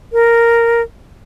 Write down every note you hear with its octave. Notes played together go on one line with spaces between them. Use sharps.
A#4